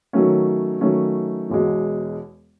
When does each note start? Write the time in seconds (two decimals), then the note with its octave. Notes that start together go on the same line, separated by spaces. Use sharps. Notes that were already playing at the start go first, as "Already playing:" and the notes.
0.13 D#3 F#3 A3 C#4
0.81 D#3 F#3 A3 C#4
1.49 E1 E2 B2 G#3